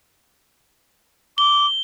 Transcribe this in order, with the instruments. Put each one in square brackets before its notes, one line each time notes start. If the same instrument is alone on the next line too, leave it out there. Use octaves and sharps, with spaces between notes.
[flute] D6 [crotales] G7